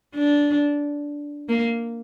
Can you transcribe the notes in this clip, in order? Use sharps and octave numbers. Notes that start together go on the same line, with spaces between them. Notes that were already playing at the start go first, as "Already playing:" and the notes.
D4
A#3